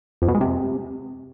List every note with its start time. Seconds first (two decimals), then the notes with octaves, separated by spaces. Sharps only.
0.22 F2
0.28 B2
0.35 G#3
0.41 C3